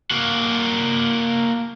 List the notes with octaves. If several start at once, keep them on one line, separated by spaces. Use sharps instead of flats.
A#3 F#4